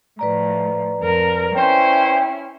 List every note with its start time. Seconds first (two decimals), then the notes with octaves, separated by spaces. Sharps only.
0.19 A2 F3 B4 D5 A#5
1.00 F2 A#4
1.55 C#4 E4 C5 G5